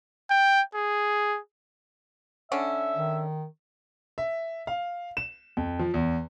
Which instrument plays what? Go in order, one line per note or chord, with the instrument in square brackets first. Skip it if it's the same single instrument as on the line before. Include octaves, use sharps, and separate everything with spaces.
[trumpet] G5
G#4
[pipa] D3 C#4 [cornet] E5
[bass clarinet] D#3
[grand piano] E5
F5
E7
F2
F3
E2